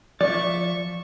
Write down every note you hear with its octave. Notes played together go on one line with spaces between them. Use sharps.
F3 D5 E5 C#6